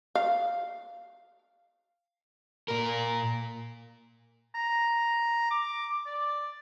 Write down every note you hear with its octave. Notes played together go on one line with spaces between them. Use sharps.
F5
A#2 A#4
A#5
D6
D5